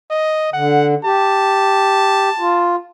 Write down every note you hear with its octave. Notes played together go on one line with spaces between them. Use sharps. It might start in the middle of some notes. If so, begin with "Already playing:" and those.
D#5
D3 F#5
G4 A5
F4